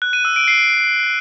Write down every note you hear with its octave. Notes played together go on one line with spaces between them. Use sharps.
F#6
D#7
E6
D7
C7